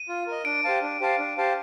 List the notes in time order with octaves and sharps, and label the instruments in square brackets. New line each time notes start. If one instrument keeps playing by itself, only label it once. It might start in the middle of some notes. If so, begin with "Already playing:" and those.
Already playing: [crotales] D#7
[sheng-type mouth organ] F4
A#4 D#5
[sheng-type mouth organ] D4 [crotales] D7
[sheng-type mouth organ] G4 C5 F5 A5
D4
G4 C5 F5 A5
D4
G4 C5 F5 A5